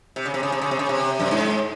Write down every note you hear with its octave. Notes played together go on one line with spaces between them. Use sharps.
C3
C#3
C3
C#3
C3
C#3
C3
C#3
C3
F#2
G#2